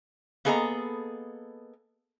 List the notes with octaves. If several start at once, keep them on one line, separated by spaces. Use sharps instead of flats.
A#3 B3 G#4 A4 D#5 A#5